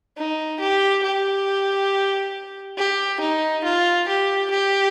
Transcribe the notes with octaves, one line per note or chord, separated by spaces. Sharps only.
D#4
G4
G4
G4
D#4
F4
G4
G4